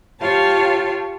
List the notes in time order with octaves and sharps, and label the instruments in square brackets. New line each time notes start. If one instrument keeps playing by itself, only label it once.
[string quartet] F4 G4 C#5 F5 A5